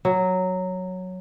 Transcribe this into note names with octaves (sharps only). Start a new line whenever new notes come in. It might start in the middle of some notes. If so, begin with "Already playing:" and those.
F#3